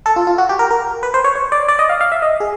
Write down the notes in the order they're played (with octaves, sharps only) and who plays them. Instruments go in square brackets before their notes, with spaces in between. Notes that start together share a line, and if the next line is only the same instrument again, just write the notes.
[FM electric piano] A4
F4
F4
F#4
G4
A#4
A#4
B4
C5
C#5
C#5
D5
D5
D#5
F5
F5
E5
D#5
G#4